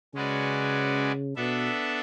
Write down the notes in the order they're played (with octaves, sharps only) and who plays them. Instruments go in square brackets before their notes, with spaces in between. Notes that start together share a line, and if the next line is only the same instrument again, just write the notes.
[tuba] C#3 [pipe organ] G#3 C#4 F#4 B4 D5
[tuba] B2 [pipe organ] B3 D4 A4 E5